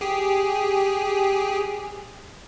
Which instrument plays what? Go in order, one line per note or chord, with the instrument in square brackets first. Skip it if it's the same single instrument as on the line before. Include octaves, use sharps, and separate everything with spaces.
[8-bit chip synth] G4 G#4